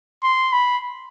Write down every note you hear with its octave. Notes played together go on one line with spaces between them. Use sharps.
C6
B5